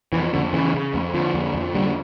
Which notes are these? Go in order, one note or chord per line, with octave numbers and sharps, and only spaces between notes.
F2 E3
F2 D3
C#3 E3
C#3
F2
D3 F3
F2
F2
D3 G3